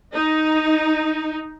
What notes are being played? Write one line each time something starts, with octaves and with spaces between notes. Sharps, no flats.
D#4